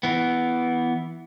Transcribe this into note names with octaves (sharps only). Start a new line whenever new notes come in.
E3 B3